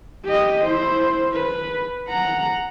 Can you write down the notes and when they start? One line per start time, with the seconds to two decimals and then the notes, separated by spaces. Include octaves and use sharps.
0.24 G4 D#5
0.64 E4 C5
1.33 B4
2.09 F#5 A#5